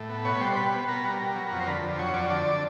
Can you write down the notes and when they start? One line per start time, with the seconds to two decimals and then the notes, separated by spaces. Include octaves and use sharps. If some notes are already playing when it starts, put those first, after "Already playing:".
Already playing: A2
0.09 B3
0.25 B2 C#5
0.40 G3 C5
0.56 B2 B4
0.72 B3
0.88 B2 A#4
1.04 G3
1.20 B2
1.35 F#3
1.51 F2
1.60 C5
1.67 D3 B4
1.83 F2
1.99 F#3 C#5
2.14 F2 D5
2.30 D3 D5